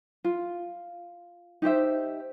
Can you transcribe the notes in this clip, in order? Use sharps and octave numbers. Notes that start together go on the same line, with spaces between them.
F4
D#4 G4 C5 E5